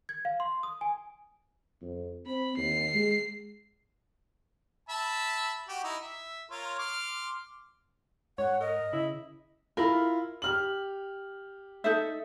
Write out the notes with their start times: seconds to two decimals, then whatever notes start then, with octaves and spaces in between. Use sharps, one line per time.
0.09 G#6
0.25 F5
0.40 C6
0.63 D#6
0.81 G#5
1.82 F2
2.26 C4 B5
2.57 D#2 C7
2.94 G#3
4.89 E5 A5 B5
5.68 F#4 G4
5.84 D#4 E4
6.01 E5
6.51 F4 A#4 C#5
6.79 C6 D6 F6
8.38 G#2 C#5 F#5
8.60 A#4 D#5
8.93 C#3 E4
9.77 E4 F4 A#4 B5
10.42 G4 F6 F#7
11.84 D#4 A4 E5